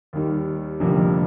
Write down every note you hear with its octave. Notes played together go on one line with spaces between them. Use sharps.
D#2 D#3 G3
F1 F2 D3 G3 A#3